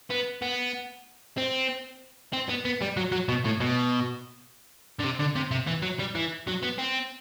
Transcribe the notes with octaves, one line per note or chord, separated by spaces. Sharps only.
B3
B3
C4
C4
B3
B3
G3
F#3
F#3
B2
A2
B2
D3
C3
D3
C3
C3
E3
F#3
G3
E3
F#3
B3
C4